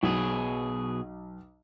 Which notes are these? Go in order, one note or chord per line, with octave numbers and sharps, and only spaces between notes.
B1 B2 F#3 G#4